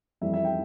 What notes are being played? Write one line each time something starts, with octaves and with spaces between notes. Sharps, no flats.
F2 E3 G3 E5
E5
G5